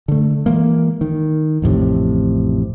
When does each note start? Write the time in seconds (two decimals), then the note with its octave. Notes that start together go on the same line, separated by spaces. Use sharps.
0.08 D3 A3
0.46 E3 G#3 A#3
1.01 D#3
1.62 A1 F2 A2 C3